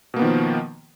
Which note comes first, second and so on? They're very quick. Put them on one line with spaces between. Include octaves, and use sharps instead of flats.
B2 A#3 B3 D#3 F3